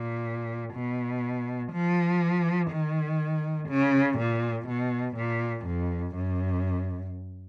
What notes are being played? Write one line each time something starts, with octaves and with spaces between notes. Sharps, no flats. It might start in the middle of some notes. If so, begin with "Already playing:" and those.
Already playing: A#2
B2
F3
D#3
C#3
A#2
B2
A#2
F2
F#2